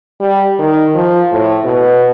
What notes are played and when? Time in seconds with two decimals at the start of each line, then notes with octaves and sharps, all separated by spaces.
0.20 G3
0.59 D#3
0.95 F3
1.32 A2
1.64 B2